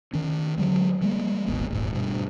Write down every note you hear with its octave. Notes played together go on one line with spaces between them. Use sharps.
D#3 C#4
D3 F#3 G#3
F3 G3 G#3 A#3
D#1 G#1 B3
D#1 G#2
G2 B2